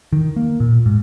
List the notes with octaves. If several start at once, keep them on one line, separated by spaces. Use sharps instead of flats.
D#3
A#3
A#2
G#2